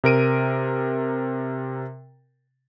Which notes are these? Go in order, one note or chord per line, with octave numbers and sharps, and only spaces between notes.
C3 A#4 D7 D#7